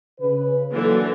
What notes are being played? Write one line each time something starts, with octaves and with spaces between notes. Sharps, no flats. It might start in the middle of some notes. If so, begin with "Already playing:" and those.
C#3 B4
D3 E3 F#3 A#3